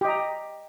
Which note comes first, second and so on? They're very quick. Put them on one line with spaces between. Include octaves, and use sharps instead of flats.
G4 D#5 A#5